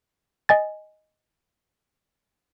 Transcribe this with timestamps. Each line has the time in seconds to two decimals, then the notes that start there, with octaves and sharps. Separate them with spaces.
0.49 D#5 G#5 A6